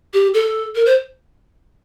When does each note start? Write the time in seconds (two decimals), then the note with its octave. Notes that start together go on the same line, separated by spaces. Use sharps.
0.14 G4
0.34 A4
0.75 A#4
0.86 C5